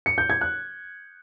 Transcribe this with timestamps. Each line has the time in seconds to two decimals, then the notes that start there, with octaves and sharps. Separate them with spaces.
0.06 C#7
0.18 G6
0.30 G#6
0.41 F#6